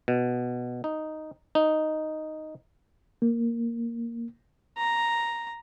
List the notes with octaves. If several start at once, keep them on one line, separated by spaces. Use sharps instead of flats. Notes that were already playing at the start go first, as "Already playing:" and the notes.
B2
D#4
D#4
A#3
A#5